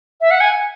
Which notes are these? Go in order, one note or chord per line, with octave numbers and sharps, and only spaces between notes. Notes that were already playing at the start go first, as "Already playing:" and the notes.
E5
F#5
G#5